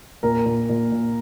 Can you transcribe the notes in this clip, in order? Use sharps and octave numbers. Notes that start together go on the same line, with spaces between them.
A#2 A#4
A#2
A#2
A#2